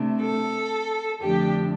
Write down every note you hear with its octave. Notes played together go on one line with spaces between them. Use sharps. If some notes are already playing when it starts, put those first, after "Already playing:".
Already playing: C3 A3 D4
A4
F2 D3 F3 A3 D4 G4